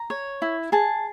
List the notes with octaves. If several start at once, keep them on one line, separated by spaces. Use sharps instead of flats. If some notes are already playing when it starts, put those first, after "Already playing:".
Already playing: A#5
C#5
E4
G#4 A5